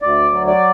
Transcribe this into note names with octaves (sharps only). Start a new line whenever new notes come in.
D2 D5
F#3
D5